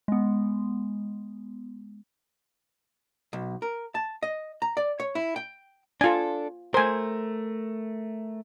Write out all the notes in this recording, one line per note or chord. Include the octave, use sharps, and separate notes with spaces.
G#3 B3
B1
A#4
A5
D#5
A#5
D5
C#5
E4
G5
D4 F4 A4 G#5
A3 A#4 C5 G#5